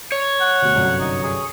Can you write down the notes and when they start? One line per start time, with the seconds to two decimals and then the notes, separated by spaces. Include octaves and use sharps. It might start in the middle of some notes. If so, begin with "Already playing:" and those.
0.12 C#5
0.41 F#5
0.62 D2 B2
0.75 G1 C2 F#2
1.01 D#4
1.24 G#4